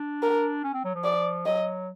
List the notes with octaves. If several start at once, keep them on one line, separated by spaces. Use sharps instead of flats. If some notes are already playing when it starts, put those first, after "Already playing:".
Already playing: D4
A#4
C#4
C4
F#3
F3
D5
F#3 D#5